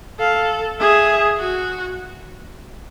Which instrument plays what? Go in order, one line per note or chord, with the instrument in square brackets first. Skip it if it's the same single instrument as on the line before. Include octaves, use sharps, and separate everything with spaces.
[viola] A4 [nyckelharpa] F5
[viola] G#4 [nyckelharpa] E5
[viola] F#4